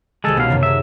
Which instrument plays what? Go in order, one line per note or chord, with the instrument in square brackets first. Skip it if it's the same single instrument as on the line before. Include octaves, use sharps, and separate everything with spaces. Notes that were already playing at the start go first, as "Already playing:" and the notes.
[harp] C2 D#3 A5 [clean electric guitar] G#3 A4
[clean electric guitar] B2 F5 [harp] C#4
[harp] F#2 C3 D#3
[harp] G#4 A#4 [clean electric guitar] E5